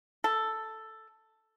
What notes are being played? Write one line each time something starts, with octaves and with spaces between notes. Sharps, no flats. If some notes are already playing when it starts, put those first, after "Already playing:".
A4